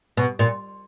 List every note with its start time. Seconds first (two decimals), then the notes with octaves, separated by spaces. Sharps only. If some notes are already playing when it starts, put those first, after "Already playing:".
0.17 B2
0.39 A#2